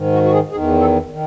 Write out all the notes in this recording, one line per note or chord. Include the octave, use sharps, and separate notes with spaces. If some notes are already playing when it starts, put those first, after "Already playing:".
Already playing: G#2 D#3
F#4
F#4
G#4
E2 D#3 G#4
A4
D#3